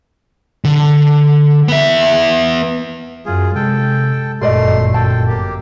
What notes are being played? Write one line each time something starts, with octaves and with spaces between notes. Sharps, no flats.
D3
B3 E5
F#2 F4 G#4
C3 G#3 A4 G5
G1 F#2 A#2 A3 A#4 D5 D#5 C6
A4 G5 A5
A#3 G4